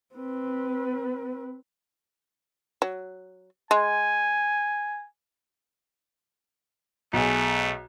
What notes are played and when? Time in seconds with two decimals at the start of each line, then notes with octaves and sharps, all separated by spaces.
0.16 C4 B4
2.82 F#3
3.71 G#3 G#5
7.13 B1 A3 G#4